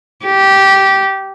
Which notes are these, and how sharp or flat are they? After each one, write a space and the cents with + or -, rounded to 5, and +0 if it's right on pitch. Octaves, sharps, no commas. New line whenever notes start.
G4 -15